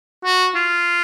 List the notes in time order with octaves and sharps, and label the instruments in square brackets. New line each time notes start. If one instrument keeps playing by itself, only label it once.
[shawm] F#4
F4